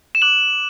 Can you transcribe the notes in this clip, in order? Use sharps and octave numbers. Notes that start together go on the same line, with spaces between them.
E7
D6 F#6 F#7